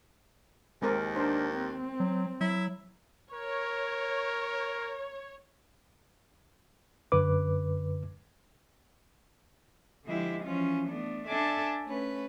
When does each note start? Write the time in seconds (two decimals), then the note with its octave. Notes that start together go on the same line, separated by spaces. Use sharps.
0.82 D#2 G#3 C4 A#4
1.16 D4 A#4 C5
1.53 C4
2.00 F#3
2.41 F#3 E4
3.34 A#4 C#5
7.12 F#2 D3 B4 D6
10.05 D3 F3 G#3 E4 G4
10.44 E3 F3 C#4 F4
10.86 A3 B3 D4
11.28 D4 A4 D5 E5 G#5 A5
11.84 A3 C#4 B4